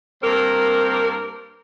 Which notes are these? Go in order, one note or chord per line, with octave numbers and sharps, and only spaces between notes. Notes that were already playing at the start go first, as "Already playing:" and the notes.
G2 A#3 C4 A#4